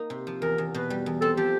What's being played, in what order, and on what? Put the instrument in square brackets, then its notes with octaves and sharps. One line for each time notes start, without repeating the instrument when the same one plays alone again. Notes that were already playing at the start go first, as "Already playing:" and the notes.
Already playing: [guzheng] A#3 D#4
C3
F3
[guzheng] E2 [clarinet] A#4
[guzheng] E2
[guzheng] B2 [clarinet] B4
[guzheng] G3
E2
[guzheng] C4 [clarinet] A4
[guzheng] F3 [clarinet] G4